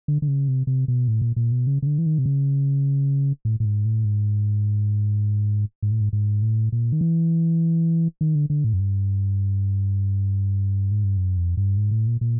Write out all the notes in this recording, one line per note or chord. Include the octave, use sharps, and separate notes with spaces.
D3
D3
C#3
C3
C3
B2
A2
A#2
A#2
B2
C#3
C#3
D3
E3
D#3
C3
C#3
A2
A2
G#2
A2
G#2
G#2
A2
G#2
G#2
A2
A#2
D#3
E3
D#3
D3
D3
A2
F#2
G2
G#2
G2
F#2
F2
G2
G#2
A2
A#2
A#2